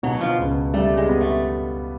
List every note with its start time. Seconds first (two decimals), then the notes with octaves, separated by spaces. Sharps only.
0.03 B2 F#3
0.21 F3
0.39 C#2
0.74 G3 A3
0.97 G#3
1.09 B3
1.21 A3